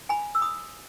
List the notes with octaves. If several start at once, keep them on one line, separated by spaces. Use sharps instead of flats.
G#5 B5
E6
B5 D#6